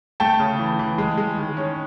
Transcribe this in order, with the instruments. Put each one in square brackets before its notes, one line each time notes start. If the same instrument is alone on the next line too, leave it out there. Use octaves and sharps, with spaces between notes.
[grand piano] A3 G5 A5
C#3
E3
E3
G#3
G#3
D#3
C#4